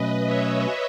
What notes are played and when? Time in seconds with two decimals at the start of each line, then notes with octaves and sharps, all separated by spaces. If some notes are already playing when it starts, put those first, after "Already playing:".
Already playing: B2 F#3 A3 C#4 B4 D#5
0.26 C#5 E5